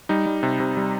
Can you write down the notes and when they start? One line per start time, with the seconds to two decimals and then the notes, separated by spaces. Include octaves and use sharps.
0.09 G3 D#4
0.26 G3
0.43 C3
0.60 C3
0.77 G3